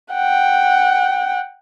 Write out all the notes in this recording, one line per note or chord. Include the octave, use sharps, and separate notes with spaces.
F#5 G5